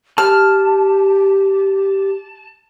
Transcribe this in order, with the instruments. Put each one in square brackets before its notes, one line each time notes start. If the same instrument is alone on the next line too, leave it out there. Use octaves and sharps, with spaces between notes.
[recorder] G4 [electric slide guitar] A5 [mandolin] F6